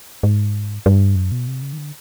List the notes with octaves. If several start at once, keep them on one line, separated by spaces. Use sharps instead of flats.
G#2
G2
F#2
B2
C3
C#3
D#3
D3